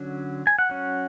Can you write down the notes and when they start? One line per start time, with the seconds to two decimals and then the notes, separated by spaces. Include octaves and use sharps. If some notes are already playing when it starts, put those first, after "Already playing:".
Already playing: D3 F#3 C#4
0.47 G#5
0.59 F#5
0.69 F#3 C#4